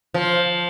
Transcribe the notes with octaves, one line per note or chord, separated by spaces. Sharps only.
F3